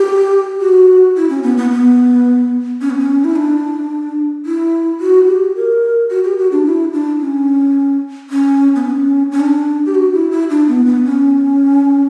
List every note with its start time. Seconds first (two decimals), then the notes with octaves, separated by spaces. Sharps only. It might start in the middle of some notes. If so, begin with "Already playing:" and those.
Already playing: G4
0.61 F#4
1.16 E4
1.30 C#4
1.43 B3
1.58 B3
1.71 B3
2.81 C#4
2.90 B3
2.99 C#4
3.24 E4
3.36 D4
4.46 E4
5.01 F#4
5.27 G4
5.56 A#4
6.10 F#4
6.24 G4
6.38 F#4
6.52 D4
6.66 E4
6.93 D4
7.20 C#4
8.30 C#4
8.75 B3
8.85 D4
8.90 C#4
9.31 C#4
9.40 D4
9.86 G4
9.95 F#4
10.14 E4
10.31 E4
10.50 D4
10.68 B3
10.86 B3
11.05 C#4